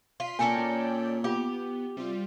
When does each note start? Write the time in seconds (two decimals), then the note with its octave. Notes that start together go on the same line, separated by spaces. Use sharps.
0.20 F4 C6 B6
0.39 A#2 C#4 A4 A#4 D5 G5 G#5
0.59 A#2
1.24 B3 F4 G4 F5 D6
1.97 C3 G3 F4